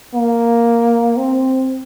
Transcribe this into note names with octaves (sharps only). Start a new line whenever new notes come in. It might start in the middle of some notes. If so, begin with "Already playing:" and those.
A#3
C4